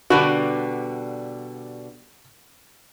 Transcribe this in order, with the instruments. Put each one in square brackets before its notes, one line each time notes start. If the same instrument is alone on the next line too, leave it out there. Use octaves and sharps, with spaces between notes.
[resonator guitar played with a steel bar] B2 D3 G3 [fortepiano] F#4